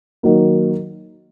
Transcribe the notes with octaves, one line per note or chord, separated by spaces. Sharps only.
D#3 F#3 A#3 D#4